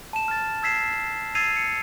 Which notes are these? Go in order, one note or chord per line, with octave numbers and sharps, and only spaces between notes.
A5 E7
F6 A6
E6 G#6 B6 C7 E7
E6 G#6 A6 C7 D#7 F7
C#7